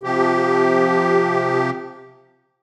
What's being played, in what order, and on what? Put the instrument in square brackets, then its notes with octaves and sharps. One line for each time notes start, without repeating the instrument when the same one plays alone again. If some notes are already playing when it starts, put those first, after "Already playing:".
[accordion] C3 F3 G4